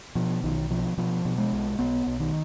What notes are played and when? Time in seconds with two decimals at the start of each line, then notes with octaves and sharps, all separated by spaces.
0.15 B2 F3
0.43 B1 D#3
0.70 B2 F3
0.98 B2 F3
1.25 B2
1.38 G#3
1.52 B1
1.79 B1 B3
2.07 B1
2.20 D#3